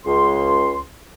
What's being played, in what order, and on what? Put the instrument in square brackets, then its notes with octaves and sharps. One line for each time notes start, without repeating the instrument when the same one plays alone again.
[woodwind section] C#2 C6